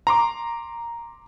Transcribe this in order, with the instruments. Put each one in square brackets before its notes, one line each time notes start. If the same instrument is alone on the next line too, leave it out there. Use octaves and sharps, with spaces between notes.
[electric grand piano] A#5 C6 D6